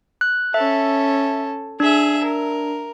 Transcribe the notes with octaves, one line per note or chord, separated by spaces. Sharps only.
F#6
C#4 A4 E5
D4 G#4 E5
A#4